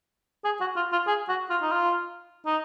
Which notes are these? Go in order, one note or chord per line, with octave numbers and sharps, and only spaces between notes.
G#4
F#4
F4
F4
G#4
F#4
F4
D#4
F4
D#4